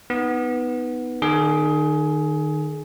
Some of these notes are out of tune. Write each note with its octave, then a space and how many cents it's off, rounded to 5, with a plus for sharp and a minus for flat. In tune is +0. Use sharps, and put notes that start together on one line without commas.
B3 +0 D#4 +0
D#3 -30 G#4 +20